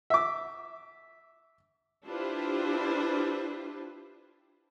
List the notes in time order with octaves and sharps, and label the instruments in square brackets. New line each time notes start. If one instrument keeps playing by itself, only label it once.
[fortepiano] E5 D6
[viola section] D4 E4 F4 G4 B4 C5